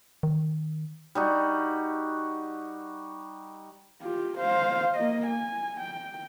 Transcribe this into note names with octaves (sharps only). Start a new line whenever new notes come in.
D#3
G3 D#4 F#4
F4 G4
C5 F5
A#3 D#5
G#5
G5